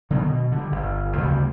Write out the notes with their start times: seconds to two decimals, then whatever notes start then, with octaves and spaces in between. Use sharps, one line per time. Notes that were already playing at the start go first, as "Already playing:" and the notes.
0.10 D3 D#3 F#3 B3
0.26 B2
0.52 D3 G3
0.72 G1
1.18 D2 C#3 E3 G3